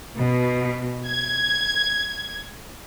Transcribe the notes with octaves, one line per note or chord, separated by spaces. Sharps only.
B2
G#6